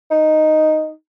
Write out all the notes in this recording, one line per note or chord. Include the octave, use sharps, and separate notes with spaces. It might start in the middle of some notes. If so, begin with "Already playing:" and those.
D#4